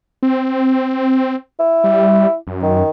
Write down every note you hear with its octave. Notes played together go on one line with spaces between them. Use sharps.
C4
E4
G3
F#2
D#3